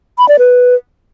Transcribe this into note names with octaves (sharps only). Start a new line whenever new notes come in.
B5
D5
B4